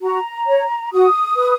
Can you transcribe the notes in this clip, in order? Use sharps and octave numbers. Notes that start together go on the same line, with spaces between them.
F#4 A#5
C#5
F#4 D#6
B4